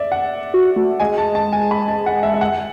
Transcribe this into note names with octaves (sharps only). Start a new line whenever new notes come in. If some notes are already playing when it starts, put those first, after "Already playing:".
Already playing: D5 E5
F#5
F#4
A3
G#3 G#5
A5
A5
G#5
B5
A5
F#5
E5
E5
F#5